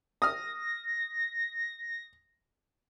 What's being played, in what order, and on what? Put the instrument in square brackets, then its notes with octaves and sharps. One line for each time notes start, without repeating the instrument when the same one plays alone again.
[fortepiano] D#6 F6 [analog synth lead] A#6